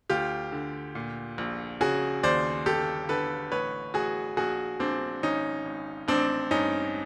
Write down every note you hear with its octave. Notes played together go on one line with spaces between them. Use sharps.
D2 F4 G4
D3
A#2
A#1
C#3 F#4 G#4
D#2 C5 D5
G1 G4 A4
D3 A4 B4
A1 B4 C#5
A1 F#4 G#4
A#1 F#4 G#4
A#1 C4 D4
G#1 C#4 D#4
G#1
A1 C4 D4
G2 C#4 D#4